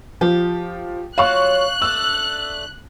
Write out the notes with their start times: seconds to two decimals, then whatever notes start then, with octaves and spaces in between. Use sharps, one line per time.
0.21 F3 G4
1.18 F#3 F4 F5 C#6 F#6
1.82 A3 D4 E6